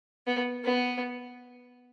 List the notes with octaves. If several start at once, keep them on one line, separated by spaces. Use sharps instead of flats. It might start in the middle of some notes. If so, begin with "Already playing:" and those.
B3
B3